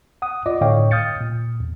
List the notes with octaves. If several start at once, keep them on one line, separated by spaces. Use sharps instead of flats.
F#5 D#6
F4 D5 D#5 D6
A2 D3 C#5 D#5 F5 G5
D#6 F6 G6 A6 C#7
A#2
E2